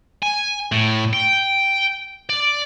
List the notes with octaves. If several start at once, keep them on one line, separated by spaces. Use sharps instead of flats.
G#5
A2
G5
D5